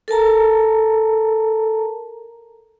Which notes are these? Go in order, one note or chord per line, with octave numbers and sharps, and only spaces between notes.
A4 A#4 A5 A#5